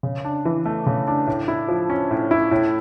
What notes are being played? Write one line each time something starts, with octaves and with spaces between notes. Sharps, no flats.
C#3
D4
E3
A3
C#3
D4
A2
E4
F3
C#4
A2
E4
A2